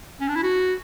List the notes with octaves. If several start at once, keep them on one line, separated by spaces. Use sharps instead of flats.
C#4
D4
E4
F#4